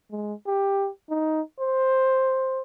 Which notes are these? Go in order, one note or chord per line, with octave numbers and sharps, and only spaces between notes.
G#3
G4
D#4
C5